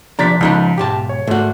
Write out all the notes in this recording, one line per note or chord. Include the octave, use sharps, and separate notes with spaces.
C3 F3 D4 A#5 A6 B6
C#2 F3 D#4 B5
B1 G#2 G4 A5
C#5
G#2 A3 F#4